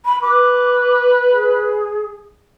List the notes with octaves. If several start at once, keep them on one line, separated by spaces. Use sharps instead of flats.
B5
B4 D6
G#4